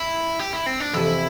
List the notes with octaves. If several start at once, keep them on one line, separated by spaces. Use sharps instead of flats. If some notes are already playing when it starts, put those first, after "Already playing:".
Already playing: E4
G4
E4
C4
D4
F2 C3 E3 E4